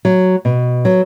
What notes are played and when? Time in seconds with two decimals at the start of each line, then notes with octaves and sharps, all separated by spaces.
0.05 F#3
0.45 B2
0.85 F#3